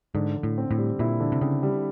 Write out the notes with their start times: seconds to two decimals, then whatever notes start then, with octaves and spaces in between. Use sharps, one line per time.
0.15 G#2 D3
0.36 D3
0.43 A2
0.58 C4
0.71 A2
0.78 G3
0.99 A#2 E4
1.20 D3
1.32 C3
1.42 C#3 C4
1.63 G3